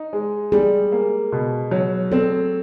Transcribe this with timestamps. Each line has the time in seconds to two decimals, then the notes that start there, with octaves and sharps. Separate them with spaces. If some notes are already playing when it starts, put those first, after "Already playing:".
Already playing: D#4
0.13 G#3
0.52 G3 G#4
0.92 A#3
1.32 B2
1.71 F#3
2.12 C4 A4